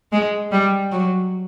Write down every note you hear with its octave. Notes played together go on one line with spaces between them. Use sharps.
G#3
G3
F#3